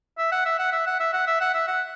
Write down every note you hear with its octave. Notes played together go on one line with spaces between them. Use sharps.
E5
F#5
E5
F#5
E5
F#5
E5
F#5
E5
F#5
E5
F#5